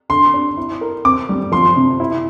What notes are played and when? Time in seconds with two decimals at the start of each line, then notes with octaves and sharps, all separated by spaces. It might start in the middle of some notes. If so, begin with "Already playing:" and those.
0.09 D3 C6
0.34 D4
0.57 E4
0.81 A#4
1.05 C4 D6
1.29 G3
1.52 F3 C6
1.76 C3
2.00 E4